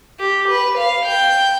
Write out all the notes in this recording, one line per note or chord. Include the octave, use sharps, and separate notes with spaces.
G4
B4
F5
G5